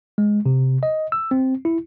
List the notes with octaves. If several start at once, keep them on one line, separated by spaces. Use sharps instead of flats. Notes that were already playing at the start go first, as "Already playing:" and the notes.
G#3
C3
D#5
E6
C4
E4